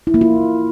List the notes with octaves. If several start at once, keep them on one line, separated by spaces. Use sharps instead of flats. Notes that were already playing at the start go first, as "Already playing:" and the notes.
E4
A#3
F4